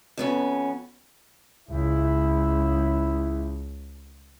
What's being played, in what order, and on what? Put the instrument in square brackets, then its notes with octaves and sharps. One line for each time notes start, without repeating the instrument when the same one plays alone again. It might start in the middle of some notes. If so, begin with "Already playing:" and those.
[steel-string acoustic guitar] F2 B3 C#4
[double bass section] C#2 [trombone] E4